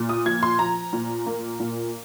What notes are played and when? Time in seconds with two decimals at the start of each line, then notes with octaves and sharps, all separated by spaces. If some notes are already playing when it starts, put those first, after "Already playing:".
Already playing: A#2
0.09 D#6
0.26 F3 G#6
0.43 C6
0.59 F3 A#5
0.93 A#2
1.26 A#3
1.60 A#2